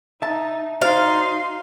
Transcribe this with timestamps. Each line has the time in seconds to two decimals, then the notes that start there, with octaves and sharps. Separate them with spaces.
0.22 D#4 E5 A5
0.81 D#4 F#4 C5 D5 F5 C6